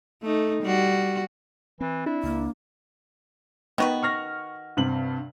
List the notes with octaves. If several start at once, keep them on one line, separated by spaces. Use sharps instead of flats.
A3 D#4
G3 F#4
E3 C4
D4 E4
C#2 A#3
D#3 B3 F#4 B4
C#6 F6 A#6
G2 C3 F#7